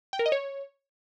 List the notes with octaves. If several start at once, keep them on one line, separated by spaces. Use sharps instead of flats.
G5
A#4
D#5
C#5